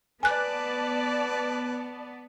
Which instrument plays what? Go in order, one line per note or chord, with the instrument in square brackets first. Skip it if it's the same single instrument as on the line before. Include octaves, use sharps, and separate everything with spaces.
[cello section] B3 [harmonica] B4 [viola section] D5 A5 [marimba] G#5 F#6